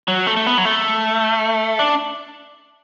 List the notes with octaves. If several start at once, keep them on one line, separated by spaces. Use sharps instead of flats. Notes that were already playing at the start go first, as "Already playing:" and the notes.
F#3
A3
A3
B3
F#3
A3
D4